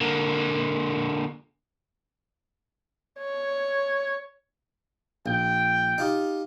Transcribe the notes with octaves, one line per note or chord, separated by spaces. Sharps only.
D3 A#3
C#5
A#1 G5
D#4 F4 G4